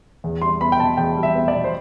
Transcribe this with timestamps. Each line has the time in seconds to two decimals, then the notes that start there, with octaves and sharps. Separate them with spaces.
0.24 E2
0.42 G3 C6
0.61 B3 B5
0.72 G5
0.79 B2 A5
0.97 E2 G5
1.17 G3
1.23 E5
1.35 B3
1.48 D5
1.54 B2
1.64 C5